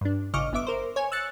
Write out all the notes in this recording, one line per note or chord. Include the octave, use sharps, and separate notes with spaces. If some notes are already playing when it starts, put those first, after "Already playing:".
G2 D4
A1 C#3 D#5 C#6 D6 F6
G1 B3 E5 D6
A#4 C5
C#5 G#5
E6 F#6 A6 C#7